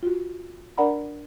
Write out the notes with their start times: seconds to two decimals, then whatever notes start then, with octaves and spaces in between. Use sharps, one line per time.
0.03 F4 F#4
0.78 D4 A#4 D5 F#5 A#5 B5